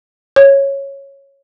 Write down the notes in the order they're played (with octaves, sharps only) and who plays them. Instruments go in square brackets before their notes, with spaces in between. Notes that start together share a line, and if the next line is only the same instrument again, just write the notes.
[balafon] C#5